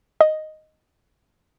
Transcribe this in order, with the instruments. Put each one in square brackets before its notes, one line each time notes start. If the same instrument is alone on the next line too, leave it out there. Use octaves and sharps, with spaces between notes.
[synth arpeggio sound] D#5